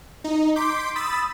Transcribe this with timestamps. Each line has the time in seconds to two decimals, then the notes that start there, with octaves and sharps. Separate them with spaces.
0.24 D#4
0.55 C6 D6 G6 B6
0.96 B5 D#6 E6 A6 B6